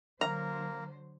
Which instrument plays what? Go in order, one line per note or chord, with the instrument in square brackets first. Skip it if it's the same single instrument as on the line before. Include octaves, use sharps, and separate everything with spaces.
[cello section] D3 F#3 C5 [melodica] A#3 A#4 [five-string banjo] A#5